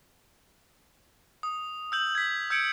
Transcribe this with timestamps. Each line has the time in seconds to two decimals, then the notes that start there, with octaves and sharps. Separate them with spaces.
1.43 D#6
1.92 E6 G6 F#7
2.15 G#6 B6
2.50 E6 G6 G#6 C#7 D7